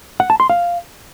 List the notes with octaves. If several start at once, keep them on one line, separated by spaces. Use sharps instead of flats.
F#5
A5
C6
F5